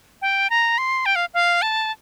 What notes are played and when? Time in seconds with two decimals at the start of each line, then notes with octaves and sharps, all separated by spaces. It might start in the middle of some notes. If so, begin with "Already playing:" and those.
0.22 G5
0.50 A#5
0.78 C6
1.06 G5
1.16 F5
1.34 F5
1.62 A5